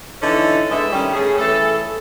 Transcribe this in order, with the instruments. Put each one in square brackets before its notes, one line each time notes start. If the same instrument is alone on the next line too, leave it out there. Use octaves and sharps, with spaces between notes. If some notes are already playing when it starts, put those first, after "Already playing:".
[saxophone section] D3 E3 C#4 D#4 E4
D3 G#3 B3 E5
D#3 G3 C#4
A3 C#4 G#4
E3 A3 A4